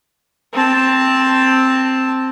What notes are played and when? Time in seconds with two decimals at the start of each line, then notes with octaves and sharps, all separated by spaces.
0.53 C4 A5